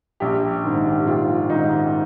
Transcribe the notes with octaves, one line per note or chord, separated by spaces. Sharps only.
A#1 G4
G#2 D#3
G4
A#1 F4
G#2 D#3 D#4